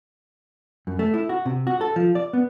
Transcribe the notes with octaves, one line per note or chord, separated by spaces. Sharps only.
F#2
A3
E4
F#4
C3
F#4
A4
F3
D5
B3